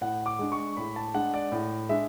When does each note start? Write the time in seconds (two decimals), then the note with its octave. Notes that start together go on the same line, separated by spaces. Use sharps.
0.01 A2 F#5
0.26 D6
0.39 G#3 D4
0.52 C#6
0.77 A2 B5
0.96 A5
1.14 G#3 D4 F#5
1.34 D5
1.52 A2
1.89 G#3 D4 E5